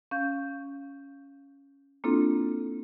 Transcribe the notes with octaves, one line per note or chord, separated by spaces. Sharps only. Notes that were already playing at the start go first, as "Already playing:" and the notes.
C#4 F5 G6
A#3 C4 D4 E4 F4 A4